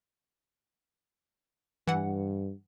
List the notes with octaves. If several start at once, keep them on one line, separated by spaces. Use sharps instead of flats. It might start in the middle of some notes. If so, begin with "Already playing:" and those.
G2 E3 F#5